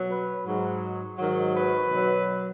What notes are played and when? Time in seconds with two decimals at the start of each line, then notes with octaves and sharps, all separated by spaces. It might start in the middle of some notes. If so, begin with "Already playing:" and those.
Already playing: B2 F#3
0.11 B4
0.47 G#2 F#3
1.19 G#2 D#3 F#3
1.55 B4
1.90 B2 F#3